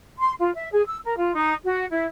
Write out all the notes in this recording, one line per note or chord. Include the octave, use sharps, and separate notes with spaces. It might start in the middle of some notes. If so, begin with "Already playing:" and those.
C6
F4
E5
G#4
E6
A#4
F4
D#4
F#4
E4